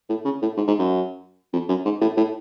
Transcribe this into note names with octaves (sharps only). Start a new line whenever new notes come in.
A2
C#3
A2
G#2
G#2
F#2
F2
F#2
G#2
A2
A2